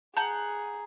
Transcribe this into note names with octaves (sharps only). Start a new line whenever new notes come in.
G#4 F#5 A5 A#5 G6